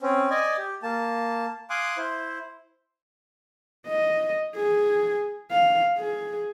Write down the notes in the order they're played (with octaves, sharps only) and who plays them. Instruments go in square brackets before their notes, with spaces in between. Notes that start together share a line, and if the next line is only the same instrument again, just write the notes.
[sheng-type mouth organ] C4 C#4
D5 D#5 G#5
G4
A#3 A5
F5 G#5 C6 D6 D#6 F#6
E4 C5
[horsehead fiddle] D#5
G#4
F5
G#4